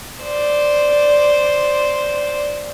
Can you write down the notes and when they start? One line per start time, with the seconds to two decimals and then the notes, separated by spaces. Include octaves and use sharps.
0.22 C5 D5